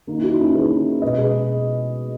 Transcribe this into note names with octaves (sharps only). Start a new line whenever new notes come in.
D#3 A#3 D#4
E4
D#4 F#4
C#4 E4
D#3 A#3 G#4 B4
B2 G#3 B4 D#5
G#4 B4